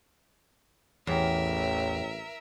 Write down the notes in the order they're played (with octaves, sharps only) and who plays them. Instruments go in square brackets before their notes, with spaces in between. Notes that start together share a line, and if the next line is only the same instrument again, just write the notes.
[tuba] A1 [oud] E2 [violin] A#4 E5 [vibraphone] C#5 G5